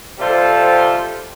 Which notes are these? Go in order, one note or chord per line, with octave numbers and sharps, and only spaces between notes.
C3 G3 F4 A4 C5